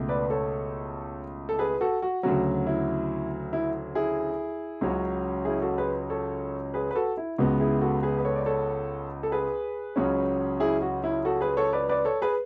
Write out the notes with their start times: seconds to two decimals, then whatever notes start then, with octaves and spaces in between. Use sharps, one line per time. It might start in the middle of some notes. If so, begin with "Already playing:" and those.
Already playing: C#2 B2 A3
0.09 B4 D5
0.30 A4 C#5
1.49 A4
1.59 G#4 B4
1.81 F#4 A4
2.02 F#4
2.23 D2 C#3 F#3 F#4
2.66 E4
3.53 E4
3.95 E4 G#4
4.81 C#2 C#3 F#3 C#4
5.45 E4 G#4
5.62 F#4 A4
5.78 G#4 B4
6.10 A4 C#5
6.74 G#4 B4
6.91 B4
6.95 F#4 A4
7.17 E4
7.38 C#2 C#3 G#3 B3 F#4
7.60 E4 G#4
7.81 F#4 A4
8.03 G#4 B4
8.18 B4
8.25 A4 C#5
8.36 D5
8.46 A4 C#5
9.23 A4
9.32 G#4 B4
9.96 C#2 C#3 F#3 C#4
10.60 E4 G#4
10.82 F#4
11.04 E4
11.25 F#4 A4
11.41 G#4 B4
11.57 A4 C#5
11.73 B4 D5
11.89 B4 D5
12.05 A4 C#5
12.22 G#4 B4